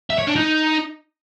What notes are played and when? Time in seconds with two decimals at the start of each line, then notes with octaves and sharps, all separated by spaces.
0.10 E5
0.19 C#5
0.27 D4
0.36 D#4